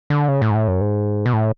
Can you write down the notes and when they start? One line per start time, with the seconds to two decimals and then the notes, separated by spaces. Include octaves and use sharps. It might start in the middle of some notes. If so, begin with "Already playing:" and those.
0.10 D3
0.28 C#3
0.42 A2
0.51 G#2
0.55 A2
0.68 F#2
0.81 G#2
1.26 B2
1.33 A2